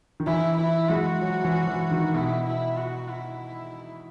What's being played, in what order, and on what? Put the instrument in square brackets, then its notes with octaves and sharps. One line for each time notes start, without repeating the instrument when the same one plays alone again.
[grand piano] D#3
[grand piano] E3 [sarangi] E4
[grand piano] E3 [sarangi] E4
[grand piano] G#3 [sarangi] F#4
[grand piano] F#3
E3
E3
D#3
[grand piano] B2 [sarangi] E4
[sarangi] E4
F#4
E4